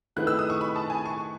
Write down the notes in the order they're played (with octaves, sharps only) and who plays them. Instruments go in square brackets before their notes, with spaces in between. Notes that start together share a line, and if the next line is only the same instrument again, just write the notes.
[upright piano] D#3 A3 E4 G#4 B4 [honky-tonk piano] F#6
[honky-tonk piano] E6
D#6
C#6
B5
A5
G#5
C#6